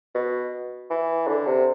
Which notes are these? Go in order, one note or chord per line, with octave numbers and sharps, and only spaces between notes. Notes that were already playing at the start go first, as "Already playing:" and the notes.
B2
E3
D3
C3